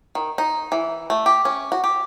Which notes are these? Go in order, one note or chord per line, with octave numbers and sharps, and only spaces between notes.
D#3
D#4
E3
A3
G4
C#4
F#4
G4